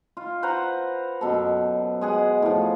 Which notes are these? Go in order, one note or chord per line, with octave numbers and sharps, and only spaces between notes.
F4
B4 C5 F#5 A#5
F#2 B2 A4
G#3 G#4 F#5
A2 F3